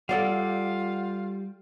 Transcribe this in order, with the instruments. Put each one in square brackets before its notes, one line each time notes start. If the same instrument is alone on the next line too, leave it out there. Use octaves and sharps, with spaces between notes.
[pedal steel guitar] G3 [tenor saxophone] F4 [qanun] A4 D5 F5 [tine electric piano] F#5